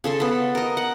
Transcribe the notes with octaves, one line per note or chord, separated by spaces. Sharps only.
C#3 A4 C6
B3 A4
A#4 D#5
F#5